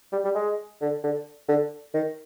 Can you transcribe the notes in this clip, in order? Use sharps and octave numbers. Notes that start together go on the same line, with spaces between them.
G3
G3
G#3
D3
D3
D3
D#3